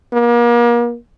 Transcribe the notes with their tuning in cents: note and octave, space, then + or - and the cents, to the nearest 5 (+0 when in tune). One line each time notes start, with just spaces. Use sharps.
A#3 +35